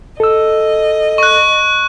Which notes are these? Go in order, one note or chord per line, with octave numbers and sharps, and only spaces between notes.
A4 D#5 E6
C#6 F#6